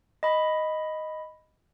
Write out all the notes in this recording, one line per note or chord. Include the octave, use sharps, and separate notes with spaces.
D#5 B5